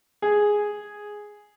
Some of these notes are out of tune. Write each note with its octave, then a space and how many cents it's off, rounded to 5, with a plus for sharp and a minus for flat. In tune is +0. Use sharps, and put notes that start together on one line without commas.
G#4 +0